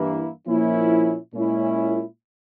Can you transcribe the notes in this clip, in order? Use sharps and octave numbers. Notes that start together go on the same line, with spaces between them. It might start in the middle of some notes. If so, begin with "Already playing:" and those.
Already playing: G2 E3 A#3 E4
A#2 F3 A#3 C#4 E4
A#2 G#3 C#4 E4